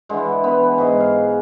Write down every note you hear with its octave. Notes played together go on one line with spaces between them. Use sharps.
D3 E3 G#3
B3 B4
G#2 G#4 D#5
F5